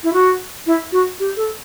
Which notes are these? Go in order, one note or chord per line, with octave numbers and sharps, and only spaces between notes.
E4
F#4
E4
F#4
G4
A4